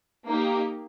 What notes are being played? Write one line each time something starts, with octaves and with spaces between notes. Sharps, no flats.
A#3 D#4 G4